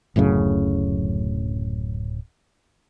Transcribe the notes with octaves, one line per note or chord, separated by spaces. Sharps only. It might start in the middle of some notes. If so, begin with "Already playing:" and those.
D1 F#2 A2 C#3